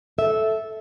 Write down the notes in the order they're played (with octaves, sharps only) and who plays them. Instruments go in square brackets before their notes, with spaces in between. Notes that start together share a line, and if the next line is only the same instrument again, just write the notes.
[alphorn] A4 [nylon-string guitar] E5